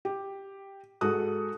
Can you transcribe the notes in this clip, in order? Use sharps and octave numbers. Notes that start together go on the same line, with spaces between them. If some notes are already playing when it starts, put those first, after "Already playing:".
G4
G#2 F#4 A4 D#6 F#6